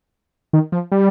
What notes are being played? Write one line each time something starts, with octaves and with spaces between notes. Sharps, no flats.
D#3
F3
G3